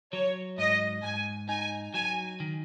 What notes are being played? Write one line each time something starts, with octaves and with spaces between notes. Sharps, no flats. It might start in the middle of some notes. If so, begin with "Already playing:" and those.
F#3 C#5
G#2 D#5
G#2 G#5
D#4 G#5
F#3 G#5
D#3